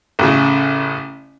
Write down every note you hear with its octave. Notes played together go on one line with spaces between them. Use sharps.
A1 C#3